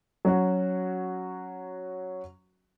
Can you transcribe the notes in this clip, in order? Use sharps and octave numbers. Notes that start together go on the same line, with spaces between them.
F#3 C#4 F#4